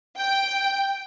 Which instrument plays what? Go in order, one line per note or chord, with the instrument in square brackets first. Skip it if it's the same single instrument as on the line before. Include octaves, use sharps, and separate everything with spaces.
[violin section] G5